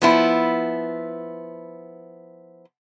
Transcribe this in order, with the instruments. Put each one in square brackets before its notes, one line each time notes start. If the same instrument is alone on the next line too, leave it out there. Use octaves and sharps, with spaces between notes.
[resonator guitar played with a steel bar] F3 B3 E4